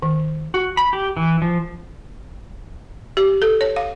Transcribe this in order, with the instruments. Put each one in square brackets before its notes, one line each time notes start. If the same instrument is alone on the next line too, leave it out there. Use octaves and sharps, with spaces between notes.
[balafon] D#3
[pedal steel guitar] F#4
B5
G4
E3
F3
[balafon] G4
A4
C#5
F5